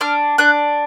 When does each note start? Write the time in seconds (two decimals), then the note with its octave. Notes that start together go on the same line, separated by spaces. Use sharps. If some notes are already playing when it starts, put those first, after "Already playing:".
0.01 D4 F6
0.38 D4 F#6